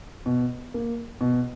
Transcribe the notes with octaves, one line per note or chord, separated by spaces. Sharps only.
B2
A#3
B2